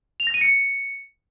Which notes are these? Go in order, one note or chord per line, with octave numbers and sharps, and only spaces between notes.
F7
A#6
D#7
C#7